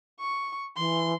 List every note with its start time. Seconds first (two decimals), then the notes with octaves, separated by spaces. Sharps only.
0.20 C#6
0.77 E3 C6